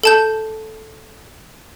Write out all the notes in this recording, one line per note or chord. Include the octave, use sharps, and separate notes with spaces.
A4 A5 G6